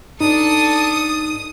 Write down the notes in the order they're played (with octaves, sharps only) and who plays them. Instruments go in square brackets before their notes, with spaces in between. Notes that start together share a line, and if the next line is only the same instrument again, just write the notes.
[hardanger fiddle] D4 A4 [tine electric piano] D#4 [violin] D#6